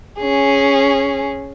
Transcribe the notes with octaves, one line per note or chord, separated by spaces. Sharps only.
C#4 G#4